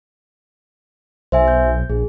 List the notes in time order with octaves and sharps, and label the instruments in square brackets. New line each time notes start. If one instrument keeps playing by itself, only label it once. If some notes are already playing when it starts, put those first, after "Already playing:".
[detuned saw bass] B1 [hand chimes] C5 E5 G#5
[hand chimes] G6
[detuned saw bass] A#1 [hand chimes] G#4